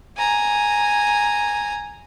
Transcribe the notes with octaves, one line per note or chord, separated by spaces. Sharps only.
G#5 A#5